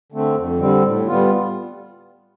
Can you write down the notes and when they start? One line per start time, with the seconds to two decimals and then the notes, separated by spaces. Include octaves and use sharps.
0.12 D3 A3 C4
0.36 F2
0.59 D3 G3 C4
0.84 A2
1.07 G3 B3 F4